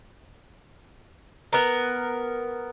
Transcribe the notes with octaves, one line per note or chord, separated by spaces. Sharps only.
B3 A#4